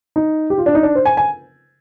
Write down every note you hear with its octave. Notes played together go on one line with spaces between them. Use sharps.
D#4
G4
F4
D4
D#4
D4
C5
G#5
G#5